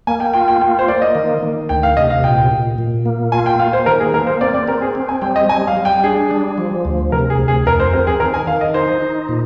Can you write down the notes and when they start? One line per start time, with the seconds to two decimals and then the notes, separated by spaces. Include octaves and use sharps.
0.07 A#3 G#5
0.20 G5
0.34 F4 G5
0.48 G5
0.61 A#3 G5
0.79 C5
0.88 A#3 D5
1.02 D#5
1.15 D#3
1.42 D#3
1.69 D2 G5
1.83 F5
1.97 C3 D#5
2.10 F5
2.24 A#2 G5
2.51 A#2
2.78 A#2
3.05 A#3
3.32 F4 G#5
3.46 G5
3.59 A#3 F5
3.73 C5
3.86 D#3 A#4
4.00 G#4
4.13 A#3 A#4
4.27 C5
4.41 C4 D5
4.54 D5
4.68 C4 A#4
4.82 G#4
4.95 C4
5.09 G#5
5.22 G3 G5
5.36 D#5
5.49 G3 G#5
5.68 F5
5.77 G3
5.85 G5
6.04 D4 G#4
6.31 G3
6.58 F3
6.85 D2
7.11 C3 A#4
7.30 G#4
7.39 D2
7.48 G#4
7.66 F2 A#4
7.80 C5
7.93 C4 A#4
8.07 G#4
8.20 D#3 A#4
8.34 G#5
8.47 D#3 F5
8.61 D#5
8.74 D#4 C5
9.02 D#4
9.29 A#2